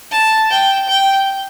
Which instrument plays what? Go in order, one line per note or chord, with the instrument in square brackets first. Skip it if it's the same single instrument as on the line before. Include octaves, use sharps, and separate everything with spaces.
[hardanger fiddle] A5
G5
G5